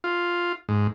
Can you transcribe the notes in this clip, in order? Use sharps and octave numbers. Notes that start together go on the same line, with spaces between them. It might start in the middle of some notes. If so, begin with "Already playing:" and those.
F4
G#2